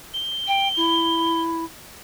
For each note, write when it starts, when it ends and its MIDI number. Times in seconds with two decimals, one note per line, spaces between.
0.14 1.41 103
0.47 0.68 79
0.76 1.64 64